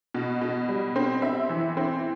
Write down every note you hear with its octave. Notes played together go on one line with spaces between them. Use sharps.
B2
B2
G3
C4
C4 E5
E3
C4